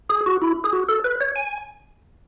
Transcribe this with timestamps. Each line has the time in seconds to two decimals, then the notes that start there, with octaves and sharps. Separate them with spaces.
0.10 G#4
0.26 F#4
0.42 E4
0.64 G#4
0.73 F#4
0.89 A4
1.04 B4
1.21 C#5
1.36 G#5